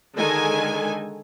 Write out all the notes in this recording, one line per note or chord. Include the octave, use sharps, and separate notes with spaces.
D3 D#3 G#3 A4 G#5